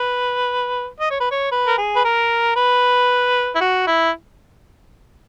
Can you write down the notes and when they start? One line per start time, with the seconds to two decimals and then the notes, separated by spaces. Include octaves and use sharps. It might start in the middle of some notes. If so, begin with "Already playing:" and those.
Already playing: B4
1.00 D#5
1.10 C#5
1.20 B4
1.31 C#5
1.51 B4
1.67 A#4
1.78 G#4
1.96 B4
2.04 A#4
2.56 B4
3.55 E4
3.60 F#4
3.87 E4